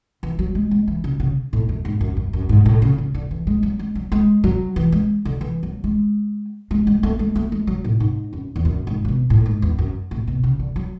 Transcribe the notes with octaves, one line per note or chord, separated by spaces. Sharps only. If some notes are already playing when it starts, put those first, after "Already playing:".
E3
F#3
G#3
G#3
E3
C#3
C#3
A2
F#2
G#2
F#2
F#2
F#2
G#2
A2
C#3
C#3
D3
E3
G#3
F#3
G#3
F#3
G#3
F#3
E3
G#3
D3
E3
F#3
G#3
G#3
G#3
A3
G#3
A3
G#3
F#3
A2
G#2
F#2
E2
F#2
G#2
C#3
B2
A2
G#2
E2
F#2
A2
B2
C#3
D3
F#3